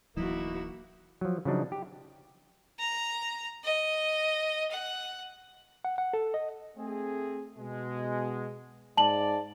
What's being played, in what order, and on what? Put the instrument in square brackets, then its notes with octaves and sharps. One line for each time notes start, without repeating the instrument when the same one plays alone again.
[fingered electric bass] D1 E3 F#3 [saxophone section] B2 D#4 E4 [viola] A#3 F#4
[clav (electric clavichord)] F3 F#3
C#3 F3 F#3 D4 D#4
G4
[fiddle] A#5
D#5
F#5
[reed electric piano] F#5
F#5
A4
D#5
[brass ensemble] A3 C4 G#4
B2 G#3
[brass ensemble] G#2 D5 [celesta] A5 F#7